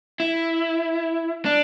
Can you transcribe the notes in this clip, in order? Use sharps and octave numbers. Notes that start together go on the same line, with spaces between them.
E4
D4